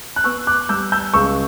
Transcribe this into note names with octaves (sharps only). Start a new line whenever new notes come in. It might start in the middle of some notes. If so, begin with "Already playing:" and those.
F#6
B3 C#6 E6
D6 F#6
G3 E6 G6
E6 G6
C#2 C#6 E6